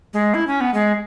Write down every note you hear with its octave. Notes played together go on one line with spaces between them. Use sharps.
G#3
E4
C#4
B3
G#3